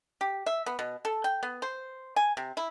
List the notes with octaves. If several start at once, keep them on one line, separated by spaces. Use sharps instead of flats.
G4
E5
B3
B2
A4
G5
B3
C5
G#5
C3
E4